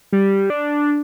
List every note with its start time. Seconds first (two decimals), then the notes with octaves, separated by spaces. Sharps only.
0.12 G3
0.50 D4